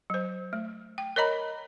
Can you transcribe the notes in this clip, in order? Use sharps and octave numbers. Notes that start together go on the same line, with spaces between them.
F#3 C5
A3
G5
A#4 C#5 D#5 A#5 B5